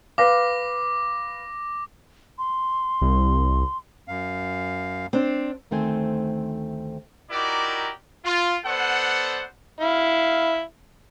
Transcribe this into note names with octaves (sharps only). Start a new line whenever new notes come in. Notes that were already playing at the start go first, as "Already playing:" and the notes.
B4 F5 D6 A#6
C6
C2
F#2 F5
C4 D4
D2 D#3 A3 C4 C5 G#5
D#4 E4 F#4 G4 A#4 D5
F4
B3 A4 C5 D5 F#5
E4 F5